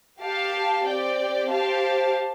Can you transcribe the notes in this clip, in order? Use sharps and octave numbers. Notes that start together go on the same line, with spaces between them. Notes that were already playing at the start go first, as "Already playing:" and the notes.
G4 F5 A5
C4 G4 D5 G5
G4 C5 F5 A5